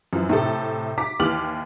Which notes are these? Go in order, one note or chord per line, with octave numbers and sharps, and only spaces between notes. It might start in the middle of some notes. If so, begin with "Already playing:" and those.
F#2 E3 F3
A2 C3 A4
A#5 D6 B6
D#2 E3 D6 F6 F#7